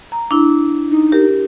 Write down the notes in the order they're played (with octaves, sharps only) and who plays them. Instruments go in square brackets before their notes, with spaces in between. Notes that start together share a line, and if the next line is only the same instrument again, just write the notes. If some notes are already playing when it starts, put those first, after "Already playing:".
[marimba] A#5
D4 E4
[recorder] D#4
[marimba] G4 A#4